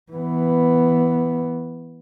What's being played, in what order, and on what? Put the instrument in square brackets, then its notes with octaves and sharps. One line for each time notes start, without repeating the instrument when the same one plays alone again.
[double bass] E3 B3